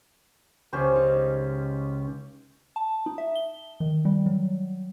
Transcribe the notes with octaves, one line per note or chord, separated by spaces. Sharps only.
C#2 C#4 G4 C5
D#4
A5
D#4
E5
G7
D#3
G3
F#3